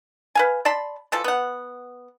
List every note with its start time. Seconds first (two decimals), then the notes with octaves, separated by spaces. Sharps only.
0.35 B4 F5 G#5
0.65 D5 A5 B5 C6
1.12 E3 F3 A4
1.24 B3 F#5